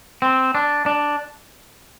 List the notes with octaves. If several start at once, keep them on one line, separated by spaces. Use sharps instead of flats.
C4
D4
D4